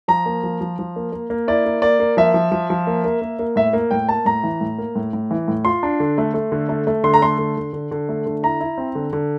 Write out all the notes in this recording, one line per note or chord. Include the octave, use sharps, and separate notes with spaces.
F3 A#5
A#3
F3
F3
F3
A#3
A#3
A#3
E4 D5
A#3
A#3 D5
A#3
F3 E5
F3
F3
F3
A#3
A#3
A#3
A#3
A2 E5
A#3
A2 G5
A#3 A5
A2 A#5
E3
A2
A#3
A2
A2
E3
A2
F4 C6
D4
D3
A3
A3
D3
A3
A3
D3 C6
A#5
A3 C6
D3
D3
D3
D3
A3
D3
E4 A#5
E4
C4
D3
D3